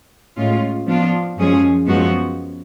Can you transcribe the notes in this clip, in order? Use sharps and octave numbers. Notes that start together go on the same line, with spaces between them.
A2 G#3 C#4 F4
F3 B3 D4 F4
F#2 F3 G#3 C#4 G#4
F#2 F3 G#3 B3 F#4